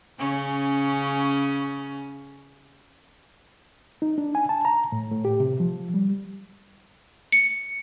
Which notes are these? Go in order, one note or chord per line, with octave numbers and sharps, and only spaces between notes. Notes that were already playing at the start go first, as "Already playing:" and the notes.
C#3 C#4
D#4
D4
G#5
A5
A#5
A2
A2
G4
C3
F3
G3
C#7